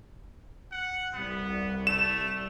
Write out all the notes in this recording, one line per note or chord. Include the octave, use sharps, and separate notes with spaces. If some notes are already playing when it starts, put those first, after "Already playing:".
F#5
C2 G3 B3
A3 E7